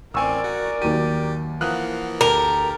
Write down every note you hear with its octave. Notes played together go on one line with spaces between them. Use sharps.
A1 C4 A#4 D5 G#5 C#6 E6
F#4
D#2 F#3 G4 D#7
E3 F3 A#3 F#5 D#6 F#6
D2 G4 A4 A#4